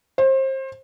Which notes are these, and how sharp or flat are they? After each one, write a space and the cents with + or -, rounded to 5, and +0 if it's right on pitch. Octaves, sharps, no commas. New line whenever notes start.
C5 +30